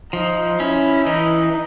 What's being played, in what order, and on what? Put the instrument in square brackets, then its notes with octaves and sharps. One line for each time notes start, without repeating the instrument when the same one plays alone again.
[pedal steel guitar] F3 [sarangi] D#4
[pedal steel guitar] C#4 [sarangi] E4
[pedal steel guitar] E3 [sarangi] D#4